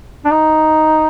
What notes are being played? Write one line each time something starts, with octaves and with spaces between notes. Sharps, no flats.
D4
D#4